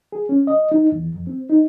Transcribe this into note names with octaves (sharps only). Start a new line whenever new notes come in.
G#4
C#4
D#5
D#4
E2
F2
C4
D#4